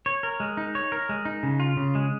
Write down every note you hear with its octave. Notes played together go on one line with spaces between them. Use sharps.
C#5
A#4
G#3
D#4
C#5
A#4
G#3
D#4
C#3
F4
C#3
G#3